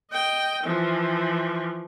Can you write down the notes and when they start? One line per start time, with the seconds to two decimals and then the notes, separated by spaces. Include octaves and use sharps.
0.12 D#5 G5
0.64 E3 F3